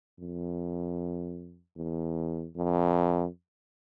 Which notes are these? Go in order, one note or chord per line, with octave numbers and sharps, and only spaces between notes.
F2
E2
F2